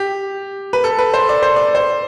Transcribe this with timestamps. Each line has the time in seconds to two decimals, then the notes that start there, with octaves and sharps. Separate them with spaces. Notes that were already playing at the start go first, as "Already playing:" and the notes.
Already playing: G4
0.73 B4
0.84 A4
0.99 B4
1.14 C5
1.29 D5
1.43 C5
1.56 D5
1.75 C5